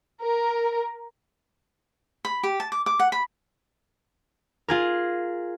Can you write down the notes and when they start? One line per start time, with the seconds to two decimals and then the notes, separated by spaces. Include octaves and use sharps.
0.22 A#4
2.25 B5
2.43 G4
2.60 A5
2.72 D6
2.86 D6
2.99 F#5
3.12 B5
4.68 F4 G#4 A#4